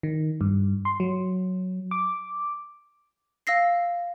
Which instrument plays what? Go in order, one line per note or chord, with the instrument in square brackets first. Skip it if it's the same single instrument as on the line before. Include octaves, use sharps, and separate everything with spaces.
[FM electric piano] D#3
G2
C6
F#3
D6
[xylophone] F5 E6 A#6 C7